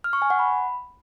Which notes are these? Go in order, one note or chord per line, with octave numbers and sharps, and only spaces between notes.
F6
C#6
G#5
F#5
B5